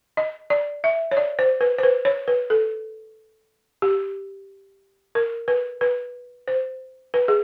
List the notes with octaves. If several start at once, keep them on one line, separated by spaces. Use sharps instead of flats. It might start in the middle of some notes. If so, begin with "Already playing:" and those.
D#5
D5
E5
C#5
D5
C5
B4
C5
B4
C#5
B4
A4
G4
A#4
B4
B4
C5
B4
G#4